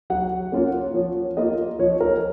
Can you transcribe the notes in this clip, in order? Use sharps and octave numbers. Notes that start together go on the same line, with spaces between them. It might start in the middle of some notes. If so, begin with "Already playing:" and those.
F#3 F#5
A#3 C#4 F4
F3 C#5
A#3 F4 D#5
F3 C#5
A#4